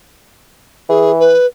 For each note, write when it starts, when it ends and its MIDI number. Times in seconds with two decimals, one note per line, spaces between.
0.89 1.33 52
0.89 1.12 68
1.20 1.46 71